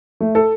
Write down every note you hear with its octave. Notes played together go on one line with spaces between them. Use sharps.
A3
A4